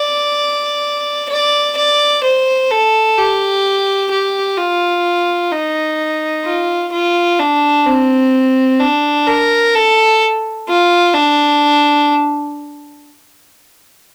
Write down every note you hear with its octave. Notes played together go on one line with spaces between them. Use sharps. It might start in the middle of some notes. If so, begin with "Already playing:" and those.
Already playing: D5
D5
D5
C5
A4
G4
G4
F4
D#4
F4
F4
D4
C4
D4
A#4
A4
F4
D4